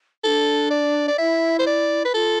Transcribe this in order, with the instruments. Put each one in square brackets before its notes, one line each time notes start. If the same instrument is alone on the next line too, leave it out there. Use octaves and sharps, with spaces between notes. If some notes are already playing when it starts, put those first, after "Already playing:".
[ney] E4 [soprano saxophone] A4
[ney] D4
[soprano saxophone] D5
D5
[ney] E4 [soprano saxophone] E5
[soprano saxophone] C5
D5
B4
[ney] F4 [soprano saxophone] A4